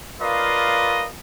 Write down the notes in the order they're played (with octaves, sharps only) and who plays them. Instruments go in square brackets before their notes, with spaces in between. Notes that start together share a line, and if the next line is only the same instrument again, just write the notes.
[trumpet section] F4 A#4 B4 D5 D#5 F5